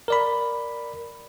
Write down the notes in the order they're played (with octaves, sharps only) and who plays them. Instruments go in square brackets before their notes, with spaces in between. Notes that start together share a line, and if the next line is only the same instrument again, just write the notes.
[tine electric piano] A#4 D5 B5